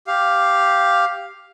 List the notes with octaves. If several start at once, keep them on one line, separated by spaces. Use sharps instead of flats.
G4 F5